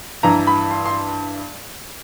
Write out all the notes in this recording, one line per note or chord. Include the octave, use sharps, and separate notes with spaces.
G2 E3 A#5
B5
C6
C6